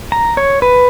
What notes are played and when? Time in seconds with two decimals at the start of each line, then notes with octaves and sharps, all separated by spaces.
0.12 A#5
0.37 C#5
0.62 B4